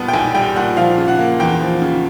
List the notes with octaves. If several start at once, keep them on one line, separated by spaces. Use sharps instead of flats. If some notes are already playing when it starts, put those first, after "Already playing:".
Already playing: A#2 G3 B3 A5
G5
B1 G#5
G3 G5
A#2 F#5
F3 F5
C#3
F#5
A#3
E2 G5
F3
C#3